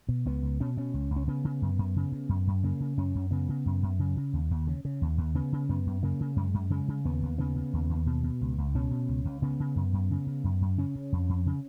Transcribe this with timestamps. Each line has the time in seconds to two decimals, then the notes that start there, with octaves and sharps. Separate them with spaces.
0.08 B2
0.26 C#2 B3
0.43 C#2
0.60 B2 C#4
0.77 B2 C#4
0.94 C#2
1.11 C#2
1.16 C#4
1.28 C#3 B3
1.45 C#3
1.62 F#2
1.79 F#2
1.96 C#3
2.12 C#3
2.29 F#2
2.47 F#2
2.64 C#3 A#3
2.80 C#3
2.97 F#2 C#4
3.15 F#2
3.31 C#3 B3
3.49 C#3
3.66 F#2
3.83 F#2
3.99 C#3
4.17 C#3
4.33 D#2
4.51 D#2
4.67 C#3
4.85 C#3
5.02 D#2
5.18 D#2
5.35 C#3 B3
5.52 C#3
5.69 F#2 B3
5.86 F#2
6.03 C#3 A#3
6.20 C#3
6.36 F#2 G#3
6.54 F#2
6.70 C#3 G#3
6.88 C#3
7.05 D#2 B3
7.22 D#2
7.38 C#3 B3
7.56 C#3
7.73 D#2
7.90 D#2
8.06 B2
8.23 B2
8.41 C#2
8.58 C#2
8.75 B2 C#4
8.91 B2
9.08 C#2
9.25 C#2
9.42 C#3 B3
9.60 C#3
9.76 F#2
9.93 F#2
10.11 C#3
10.27 C#3
10.44 F#2
10.61 F#2
10.78 C#3 C#4
10.95 C#3
11.12 F2
11.29 F2
11.46 C#3